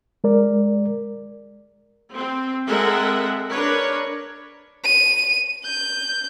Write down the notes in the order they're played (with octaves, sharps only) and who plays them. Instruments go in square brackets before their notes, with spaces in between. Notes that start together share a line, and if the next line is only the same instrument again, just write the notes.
[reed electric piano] G#3 A#4 D5
[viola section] C4
G#3 C4 A4 A#4 E5 F#5
D4 A#4 B4 C#5
[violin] D#7
G6